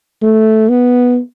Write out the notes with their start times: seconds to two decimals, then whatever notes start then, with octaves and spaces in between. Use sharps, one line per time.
0.22 A3
0.69 B3